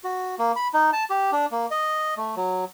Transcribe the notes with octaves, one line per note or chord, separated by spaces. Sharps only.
F#4
A#3
B5
D#4
A5
G4
D4
A#3
D#5
A3
F#3